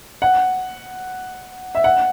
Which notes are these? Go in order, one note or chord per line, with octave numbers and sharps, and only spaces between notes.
F#5
E5
F#5